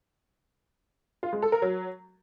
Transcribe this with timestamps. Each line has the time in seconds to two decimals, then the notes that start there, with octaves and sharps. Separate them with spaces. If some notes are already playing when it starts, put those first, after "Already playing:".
1.23 F4
1.33 G#3
1.42 A4
1.52 A#4
1.62 F#3